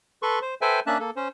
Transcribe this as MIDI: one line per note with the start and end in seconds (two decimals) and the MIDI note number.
0.22 0.39 69
0.22 0.39 71
0.22 0.39 84
0.22 0.39 85
0.42 0.55 72
0.61 0.80 69
0.61 0.80 71
0.61 0.80 72
0.61 0.80 76
0.61 0.80 79
0.61 0.80 80
0.87 0.98 58
0.87 0.98 61
0.87 0.98 62
0.87 0.98 76
0.87 0.98 81
0.87 0.98 90
1.00 1.11 58
1.00 1.11 69
1.16 1.28 61
1.16 1.28 72